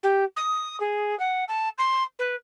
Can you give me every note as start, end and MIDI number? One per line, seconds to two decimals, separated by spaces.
0.03 0.24 67
0.36 0.79 87
0.80 1.18 68
1.20 1.45 78
1.48 1.69 81
1.78 2.04 84
2.19 2.36 71